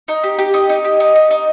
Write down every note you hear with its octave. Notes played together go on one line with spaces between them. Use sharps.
D#4
G4
G4
D#4 D#5
D#4
G4
D#4
D#4
D#4